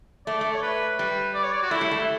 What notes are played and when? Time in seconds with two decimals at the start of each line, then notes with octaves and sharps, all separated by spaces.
0.26 A3 D5
0.41 A3
0.54 C#5
0.62 B4
0.99 G3 B4
1.34 D5
1.43 C#5
1.52 D5
1.62 F#4
1.71 A3 E4
1.81 G3
1.91 A3